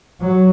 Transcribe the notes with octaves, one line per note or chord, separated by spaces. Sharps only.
F#3